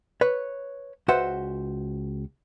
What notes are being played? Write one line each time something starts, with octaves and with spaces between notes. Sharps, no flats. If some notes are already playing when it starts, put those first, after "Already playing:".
B4 C#5
C#2 F#4 B4 C5 E5 F#5